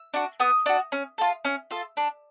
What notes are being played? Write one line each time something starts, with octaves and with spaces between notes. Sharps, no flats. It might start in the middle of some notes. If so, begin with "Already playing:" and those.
Already playing: E6
D4 F#4
B3 D#6
D4 F#4
C#4
F4 A4
C#4
F4 A4
D4